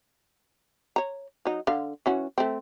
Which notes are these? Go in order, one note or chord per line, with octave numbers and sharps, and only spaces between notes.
C#5 A#5
F#3 D#4
D3 F5
E3 C#4 F#4
A3 C4